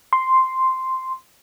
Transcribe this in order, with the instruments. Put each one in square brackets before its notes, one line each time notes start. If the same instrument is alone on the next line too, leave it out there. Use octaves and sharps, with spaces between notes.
[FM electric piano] C6